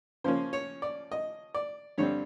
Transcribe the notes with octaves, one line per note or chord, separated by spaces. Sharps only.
C#3 F3 A#3 C#4 C5
C#5
D5
D#5
D5
G2 D3 G3 C4 C#5